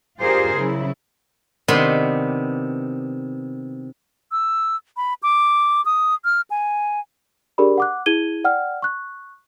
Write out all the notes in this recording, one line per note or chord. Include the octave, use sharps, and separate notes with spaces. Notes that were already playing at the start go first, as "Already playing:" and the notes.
D4 F4 G4 G#4 A#4 C5
C#3 F#3 E4
C3 D#3 B3 D4 B5 C6
E6
B5
D6
D#6
F6
G#5
D4 G4 G#4 A#4 D5 B5
F#5 D6 F#6
E4 G#4 G#6 D#7 G7
D5 F#5 G5 F6
C#6 F#6